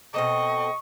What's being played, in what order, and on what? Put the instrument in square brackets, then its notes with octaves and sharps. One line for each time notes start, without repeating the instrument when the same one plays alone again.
[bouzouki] B2 C4 A4 [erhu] D#5 [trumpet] C#6